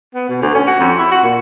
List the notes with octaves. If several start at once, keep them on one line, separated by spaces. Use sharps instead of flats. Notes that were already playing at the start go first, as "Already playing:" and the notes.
B3
B2
D2
C#4
F#4
F2
E4
F#4
A#2